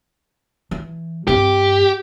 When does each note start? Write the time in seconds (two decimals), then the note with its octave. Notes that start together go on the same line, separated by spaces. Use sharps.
0.71 E3
1.28 G2 C4 G4